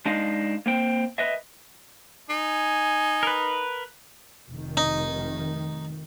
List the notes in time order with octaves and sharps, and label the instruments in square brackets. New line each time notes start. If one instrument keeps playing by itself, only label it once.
[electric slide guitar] G#3 D4 D#4 D#5 F5
A#3 C4 G5
B4 D#5 E5
[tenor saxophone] D#4 [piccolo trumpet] G#5
[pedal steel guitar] A#4 B4
[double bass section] F1 D#3
[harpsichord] D#4